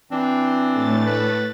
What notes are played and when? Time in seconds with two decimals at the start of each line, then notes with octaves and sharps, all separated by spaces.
0.11 E3 C4 D4
0.72 A2 A3 A6
1.06 B4